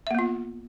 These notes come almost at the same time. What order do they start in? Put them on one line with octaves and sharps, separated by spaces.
E5 A#3 B3 F4